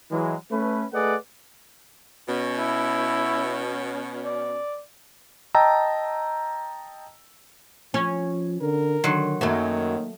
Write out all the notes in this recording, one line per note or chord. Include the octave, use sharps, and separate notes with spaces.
E3 F#3 G#3
A3 C#4 B4
A3 G#4 B4 D5 D#5 F#5
B2 C#4
E4
D5
D#5 G5 A5 A#5 E6
F3 C#4
D3 A#4
D3 D#3 F#3 C6
F#2 D#3 F#3 A3 A#3